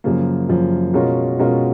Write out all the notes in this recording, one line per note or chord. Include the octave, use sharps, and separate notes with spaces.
F#2 C#3 F3 A#3
F#2 C#3 F3 A#3
B2 G#3 C#4 F4 A#4
B2 G#3 C#4 F4 A#4